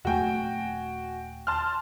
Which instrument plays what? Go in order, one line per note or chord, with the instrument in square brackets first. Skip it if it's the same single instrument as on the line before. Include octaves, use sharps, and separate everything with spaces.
[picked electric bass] D#1 A3 [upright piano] F#4 G5 G#5
[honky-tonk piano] A5 C6 F6